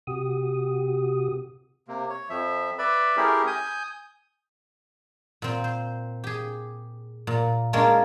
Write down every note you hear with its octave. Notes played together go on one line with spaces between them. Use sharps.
C3 F#4 G4 D#6
C3 A#3
C#5
F2 F3 E5
B4 D5 E5 B5
A3 C#4 E4 G4 G#4 A#4
G#5 D#6 G6
A#2 C4
C5
G4 G#4
A#2
G#3 A#3 C#4 D4 F4 A#4